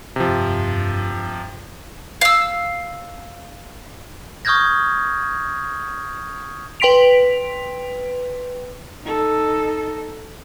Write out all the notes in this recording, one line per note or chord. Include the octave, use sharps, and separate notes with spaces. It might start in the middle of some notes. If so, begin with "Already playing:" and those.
F1 G2 C3 F3
F5 E6
C#6 D#6 F6 G6 G#6 A#6
B4 G5 C6 B6 D7 F7
D#4 A4